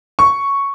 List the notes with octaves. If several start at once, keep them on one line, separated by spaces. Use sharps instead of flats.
C#6